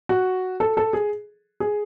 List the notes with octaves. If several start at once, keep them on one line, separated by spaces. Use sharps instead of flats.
F#4
A4
A4
G#4
G#4